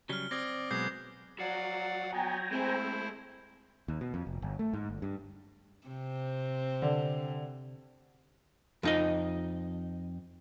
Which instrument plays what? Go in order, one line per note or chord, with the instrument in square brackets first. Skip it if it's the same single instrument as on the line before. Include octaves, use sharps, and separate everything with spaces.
[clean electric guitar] C#3 F#3 G3 [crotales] F6 G7
[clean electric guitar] C4 [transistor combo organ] D5 [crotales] D#6 G#6 A#6
[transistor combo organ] B2 F#3 G#3 [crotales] D6 G6 C7
[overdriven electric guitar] F3 F#3 [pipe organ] D5 F5 F#5
[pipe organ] B3 [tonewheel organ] G5 G#5 A#5
[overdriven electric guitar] G#3 A3 [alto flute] C4 [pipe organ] E4 C5
[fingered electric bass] D#2
B2
F2
F1
G1
A3
G#2
G1
G2
[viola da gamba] C3 C4
[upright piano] D3
[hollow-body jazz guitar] F2 D#4 D#5